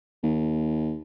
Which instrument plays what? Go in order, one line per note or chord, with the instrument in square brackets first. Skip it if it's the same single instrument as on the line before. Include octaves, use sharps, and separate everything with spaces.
[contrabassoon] D#2